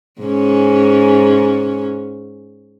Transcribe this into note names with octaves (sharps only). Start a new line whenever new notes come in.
G#2 C#4